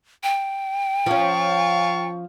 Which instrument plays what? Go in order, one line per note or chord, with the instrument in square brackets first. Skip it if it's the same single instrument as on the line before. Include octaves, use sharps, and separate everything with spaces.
[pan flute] G5
[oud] F3 C#4 [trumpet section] F5 A5 C#6